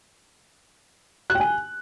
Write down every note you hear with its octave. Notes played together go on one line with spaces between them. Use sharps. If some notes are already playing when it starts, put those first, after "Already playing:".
F#6
G5
G#5